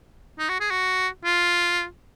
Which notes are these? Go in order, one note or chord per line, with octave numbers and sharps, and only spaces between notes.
D#4
F#4
G#4
F#4
F4